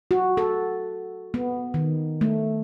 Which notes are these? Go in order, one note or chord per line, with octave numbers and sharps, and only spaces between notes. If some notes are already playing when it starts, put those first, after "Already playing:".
F#4
A4
B3
D#3
A3